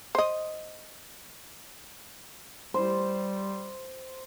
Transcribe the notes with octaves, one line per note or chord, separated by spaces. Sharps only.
C5 D#5
G3 C5